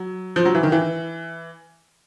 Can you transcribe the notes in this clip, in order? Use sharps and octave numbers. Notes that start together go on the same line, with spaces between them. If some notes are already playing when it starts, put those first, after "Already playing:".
Already playing: F#3
F3
F#3
E3
D#3
E3